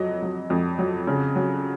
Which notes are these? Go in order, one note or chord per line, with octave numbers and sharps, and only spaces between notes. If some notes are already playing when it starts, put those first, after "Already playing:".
Already playing: F2 F#3 D#5
F#3
F2
F#3
C#3
F#3